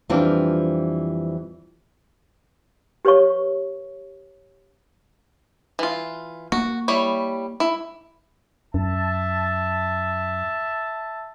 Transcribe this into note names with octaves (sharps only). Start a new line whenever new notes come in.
F2 E3 G3 C4 D4 F4
G4 B4 C#5 F5 C#6
E3 F4
A#3 F#4
G3 E4 C#5
E4
F#2 E5 A5